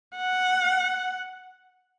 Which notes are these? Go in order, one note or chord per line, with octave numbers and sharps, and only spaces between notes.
F#5